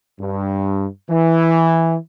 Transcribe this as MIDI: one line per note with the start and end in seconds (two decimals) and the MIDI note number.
0.20 0.86 43
1.10 1.95 52